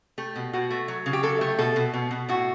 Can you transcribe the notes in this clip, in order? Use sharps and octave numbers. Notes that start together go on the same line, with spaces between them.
A3 G4
B2
B2 F#4
A3
F#3
C#3
G4
F#3 A4
A3 G4
B2 A4
B2
B2
B2
A2 F#4